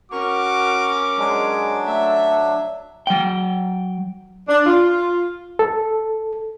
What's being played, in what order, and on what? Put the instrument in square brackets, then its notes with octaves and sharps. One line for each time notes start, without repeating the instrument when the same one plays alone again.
[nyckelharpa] C#4 A#4 [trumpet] F#4 [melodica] C#6 [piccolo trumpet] D6
[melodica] F#3 D4 [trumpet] G#3
[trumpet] A3 [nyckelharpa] E5
[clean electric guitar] F#3 G5
[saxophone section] D4
F4
[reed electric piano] A4